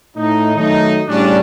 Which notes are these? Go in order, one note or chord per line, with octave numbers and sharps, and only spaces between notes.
A2 D#4
D#3 F#3 A3 D#4
A2 C#3 G3 C#4 D4